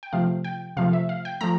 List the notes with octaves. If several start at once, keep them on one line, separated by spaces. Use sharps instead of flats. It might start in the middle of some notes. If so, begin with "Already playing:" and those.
G5
C3 F3 A3 F5
G5
C3 F3 A3 F5
E5
F5
G5
F3 A3 A#5